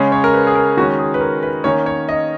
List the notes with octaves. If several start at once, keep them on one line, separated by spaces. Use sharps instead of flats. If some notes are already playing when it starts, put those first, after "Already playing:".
Already playing: C#3 G#3 C#4
C#5
A#4
B4
G#4
A#4
D#3 G#3 C#4 F#4
G#4
B4
A#4
B4
D#3 A#3 C#4 C#5
C#5
D#5